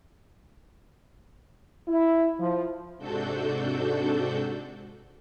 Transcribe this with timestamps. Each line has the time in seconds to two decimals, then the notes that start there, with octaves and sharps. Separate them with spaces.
1.88 E4
2.40 F3
2.98 G#2 C3 D4 F#4 A4 G6